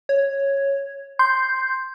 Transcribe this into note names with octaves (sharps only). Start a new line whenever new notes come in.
C#5
C6 G6